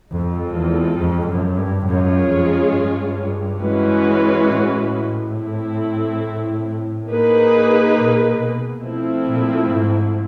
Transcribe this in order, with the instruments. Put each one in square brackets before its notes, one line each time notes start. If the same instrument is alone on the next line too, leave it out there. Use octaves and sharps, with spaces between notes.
[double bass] F2 [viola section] G#3 C4 F4 A4
[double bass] E2
F2
F#2
G2
[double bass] F#2 [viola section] G#3 C#4 F4 G#4 C#5
[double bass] F2
G2
[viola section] E3 G#3 C#4 F#4 B4
[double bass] A2
[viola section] A3 C4 E4
A#3 D#4 G#4 B4
[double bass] A#2
B2
[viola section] F3 A3 C4 E4
[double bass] A#2
G#2